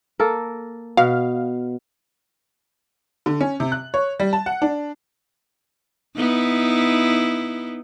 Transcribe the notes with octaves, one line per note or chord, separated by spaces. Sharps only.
A#3 A4 A#4
B2 F5
D3
C#4
C3
F#6
C#5
G3
A5
F#5
D4
B3 D#4 E4